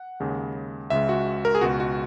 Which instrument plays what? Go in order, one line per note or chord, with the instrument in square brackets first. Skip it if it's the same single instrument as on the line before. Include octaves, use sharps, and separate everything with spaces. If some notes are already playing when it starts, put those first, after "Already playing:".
Already playing: [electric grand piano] F#5
D#2 C#3 G#3
C#2 C#3 G#3 E5
F#4
A#4
G#4
C#2 B2 G#3 F#4
F#4